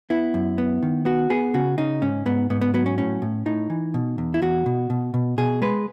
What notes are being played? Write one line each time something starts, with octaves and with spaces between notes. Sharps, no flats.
B3 E4
F#2
B3
D#3
B3 F#4
B3 G#4
C#3 F#4
C#3 D#4
G#2 C#4
G#2 B3
G#2 B3
B3
F#3 B3
C#4
A2 C#4
A2
A2 D#4
E3
B2
E2
E4
E2 F#4
B2
B2
B2
B2 G#4
G#3 B4